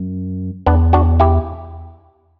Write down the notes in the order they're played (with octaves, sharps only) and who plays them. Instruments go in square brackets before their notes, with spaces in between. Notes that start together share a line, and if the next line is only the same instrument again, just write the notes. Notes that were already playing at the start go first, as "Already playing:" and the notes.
Already playing: [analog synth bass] F#2
[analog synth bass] E2 [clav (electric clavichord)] B3 D4
[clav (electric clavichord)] D4 F#4
E4 G4